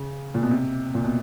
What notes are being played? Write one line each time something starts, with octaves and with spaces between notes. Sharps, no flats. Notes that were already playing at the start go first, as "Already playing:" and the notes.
Already playing: C#3
A#2
B2
C3
A#2
B2